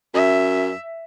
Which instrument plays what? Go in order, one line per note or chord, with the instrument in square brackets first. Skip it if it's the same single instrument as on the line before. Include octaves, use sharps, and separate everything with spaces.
[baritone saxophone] F#2 [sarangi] E5